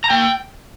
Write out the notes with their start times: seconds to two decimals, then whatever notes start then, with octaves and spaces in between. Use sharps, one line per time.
0.04 A#5
0.10 A#3 G5